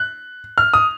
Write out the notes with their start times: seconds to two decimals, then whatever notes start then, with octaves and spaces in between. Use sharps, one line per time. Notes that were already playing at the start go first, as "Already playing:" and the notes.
Already playing: F#6
0.58 F6
0.74 D#6